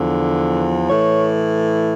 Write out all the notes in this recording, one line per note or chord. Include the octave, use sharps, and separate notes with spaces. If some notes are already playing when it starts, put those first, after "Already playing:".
Already playing: E2 D3 F3
A2 E3 C#5